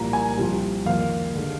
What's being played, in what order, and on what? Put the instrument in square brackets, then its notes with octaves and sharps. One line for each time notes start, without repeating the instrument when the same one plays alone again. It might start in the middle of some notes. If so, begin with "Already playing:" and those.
Already playing: [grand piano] C2 A#2 F3 A#3 A#5
G#5
C2 C3 F3
F2 D#3 A#3 F4 F5
D#2 D3 G#3